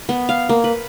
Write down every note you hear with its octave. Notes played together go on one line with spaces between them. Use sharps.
B3
F5
A#3
B4